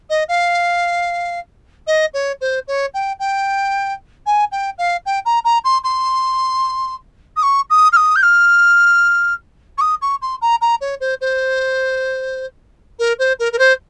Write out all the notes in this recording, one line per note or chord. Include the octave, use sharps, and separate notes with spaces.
D#5
F5
D#5
C#5
C5
C#5
G5
G5
G#5
G5
F5
G5
A#5
A#5
C6
C6
D#6
C#6
D#6
F6
D#6
G6
F6
C#6
D#6
C#6
C6
A#5
A#5
C#5
C5
C5
A#4
C5
A#4
A#4
C5